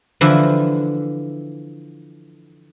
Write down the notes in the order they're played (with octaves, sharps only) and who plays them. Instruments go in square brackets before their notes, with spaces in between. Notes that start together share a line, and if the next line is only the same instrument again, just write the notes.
[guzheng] D3 E3 F3 E4